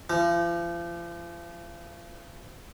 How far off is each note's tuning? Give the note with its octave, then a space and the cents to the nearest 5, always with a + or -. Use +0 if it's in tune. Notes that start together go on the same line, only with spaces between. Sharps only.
F3 -40